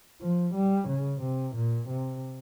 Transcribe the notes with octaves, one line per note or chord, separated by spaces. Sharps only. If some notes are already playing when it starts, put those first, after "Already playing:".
F3
G3
C#3
C3
A#2
C3